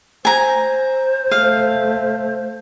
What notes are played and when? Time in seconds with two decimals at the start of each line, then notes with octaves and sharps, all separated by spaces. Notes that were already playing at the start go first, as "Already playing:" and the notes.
0.25 C5 G#5 A#5
1.31 A3 F5